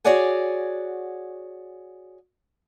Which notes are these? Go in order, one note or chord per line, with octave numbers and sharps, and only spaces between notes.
F#4 G#4 C#5 D5 F#5 G#5